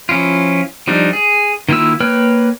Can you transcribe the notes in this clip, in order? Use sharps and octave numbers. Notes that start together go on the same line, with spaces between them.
F3 C#4 E4 F4
F3 G3 D4 D#4
G#4
D#3 A#3 E4 F4 E6
A#3 B4 C#5 G5 F6